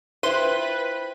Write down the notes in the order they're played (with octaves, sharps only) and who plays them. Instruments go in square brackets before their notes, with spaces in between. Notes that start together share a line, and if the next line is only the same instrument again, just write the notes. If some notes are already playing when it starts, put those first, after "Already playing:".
[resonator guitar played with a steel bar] E4 F4 [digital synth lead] B4 [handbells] C5 G5 [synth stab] C6 D#7